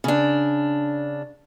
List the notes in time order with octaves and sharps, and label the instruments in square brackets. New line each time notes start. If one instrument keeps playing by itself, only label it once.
[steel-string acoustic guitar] C#3 D4